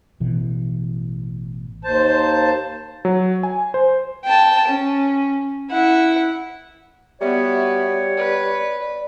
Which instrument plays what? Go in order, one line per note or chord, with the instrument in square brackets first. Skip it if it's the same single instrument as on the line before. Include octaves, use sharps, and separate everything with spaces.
[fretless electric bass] A1 B2 E3
[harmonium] D#2 C5 A5
[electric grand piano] F#3
G#5
C5
[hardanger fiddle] G5 A5
C#4
E4 F#5
[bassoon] G3 [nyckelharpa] B3 F#4 [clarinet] C#5 [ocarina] E5
[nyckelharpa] B4 [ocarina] D5